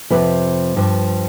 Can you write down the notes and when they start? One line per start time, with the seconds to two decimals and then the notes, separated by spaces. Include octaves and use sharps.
0.10 F2 C3 F3 B4
0.76 G2 F3